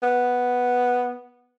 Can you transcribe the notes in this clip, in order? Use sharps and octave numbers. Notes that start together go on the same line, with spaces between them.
B3